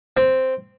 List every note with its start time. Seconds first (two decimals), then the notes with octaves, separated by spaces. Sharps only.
0.17 C4